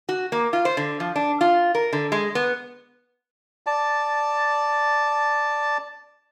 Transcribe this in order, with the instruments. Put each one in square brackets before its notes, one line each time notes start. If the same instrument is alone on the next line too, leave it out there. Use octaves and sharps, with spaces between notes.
[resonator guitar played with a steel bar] F#4
A#3
F4
C5
D3
F3
D4
F4
A#4
D3
G#3
B3
[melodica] D5 A5